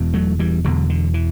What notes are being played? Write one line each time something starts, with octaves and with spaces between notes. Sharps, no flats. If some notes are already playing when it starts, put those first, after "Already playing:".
Already playing: E1 E2 B2
F#3 A3
E3 G3
E1 E2 B2 D3 F#3
D3
E3